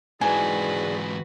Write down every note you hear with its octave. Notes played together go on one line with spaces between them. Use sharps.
G#2 E3 F#4 G#4 B4 D5 G#5